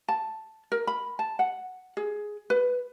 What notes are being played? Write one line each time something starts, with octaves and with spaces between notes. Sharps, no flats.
A5
A#4
B5
A5
F#5
G#4
B4